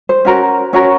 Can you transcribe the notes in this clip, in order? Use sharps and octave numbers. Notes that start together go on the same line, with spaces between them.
C5
C#4 F#4 A#4
C#4 F#4 A#4 C#5